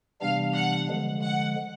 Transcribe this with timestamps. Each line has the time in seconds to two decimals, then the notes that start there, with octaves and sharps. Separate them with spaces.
0.21 C3 E3 G3 B3 D4 F5
0.54 F#5
0.88 D3 F3 G#3
1.22 F#5